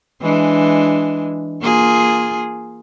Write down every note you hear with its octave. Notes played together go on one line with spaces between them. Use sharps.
E3 G#3 D4
A#3 F4 G#4